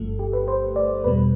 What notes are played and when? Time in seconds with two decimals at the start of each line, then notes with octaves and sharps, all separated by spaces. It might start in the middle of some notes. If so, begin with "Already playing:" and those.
Already playing: G1 G2 F3 A3 A4
0.19 G4
0.33 B4
0.48 C5
0.76 D5
1.04 E2 B2 G3 B4